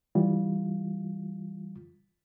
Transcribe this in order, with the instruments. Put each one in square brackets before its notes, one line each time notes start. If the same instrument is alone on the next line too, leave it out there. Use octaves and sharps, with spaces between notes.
[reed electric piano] E3 G3 F4